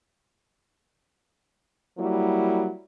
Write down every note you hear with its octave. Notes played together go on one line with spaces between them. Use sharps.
F#3 G3 A#3 E4